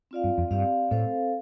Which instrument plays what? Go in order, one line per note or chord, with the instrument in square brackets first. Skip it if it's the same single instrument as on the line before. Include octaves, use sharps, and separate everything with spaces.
[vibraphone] C4 F4 D5 F5
[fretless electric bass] G2
F2
[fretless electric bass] G2 [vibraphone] C4 G4 D5 F5
[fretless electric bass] A2 [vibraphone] C4 A4 C5 F5